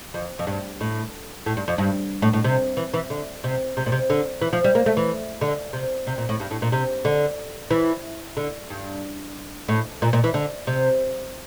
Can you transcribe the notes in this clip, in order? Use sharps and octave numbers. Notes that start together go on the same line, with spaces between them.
F2
F2
G2
A2
A2
G2
F2
G2
A2
A2
C3
E3
E3
D3
C3
C3
A#2
C3
D3
E3
F3
G3
A#3
A3
E3
D3
C3
C3
A#2
A2
G2
A2
A#2
C3
D3
E3
D3
G2
A2
A#2
A#2
E3
D3
C3